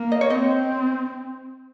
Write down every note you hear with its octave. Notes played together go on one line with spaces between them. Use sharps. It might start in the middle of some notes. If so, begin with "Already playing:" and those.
Already playing: A#3
D#5
C#5
C4 D#5